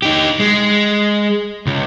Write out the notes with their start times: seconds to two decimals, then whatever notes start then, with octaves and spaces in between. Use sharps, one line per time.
0.02 D#4 G4
0.40 G#3
1.67 C#2